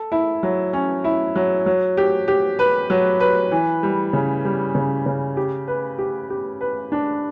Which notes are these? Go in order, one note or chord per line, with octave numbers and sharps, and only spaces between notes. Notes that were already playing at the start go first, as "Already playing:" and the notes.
Already playing: A4
E4
F#3
C#4
E4
F#3
F#3
G4
G4
B4
F#3
B4
E3
G3
C#3
G3
C#3
C#3
G4
B4
G4
G4
B4
D4